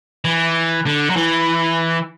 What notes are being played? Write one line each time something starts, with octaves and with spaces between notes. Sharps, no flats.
E3
D3
F#3
E3